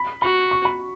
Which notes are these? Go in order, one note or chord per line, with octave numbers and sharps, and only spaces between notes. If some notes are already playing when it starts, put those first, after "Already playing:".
Already playing: B5
F#4 B5
C#6
B5